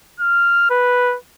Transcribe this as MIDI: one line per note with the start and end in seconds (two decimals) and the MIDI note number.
0.20 0.70 89
0.70 1.16 71